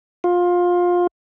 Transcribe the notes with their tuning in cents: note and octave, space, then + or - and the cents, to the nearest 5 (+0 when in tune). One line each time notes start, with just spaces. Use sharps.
F4 +20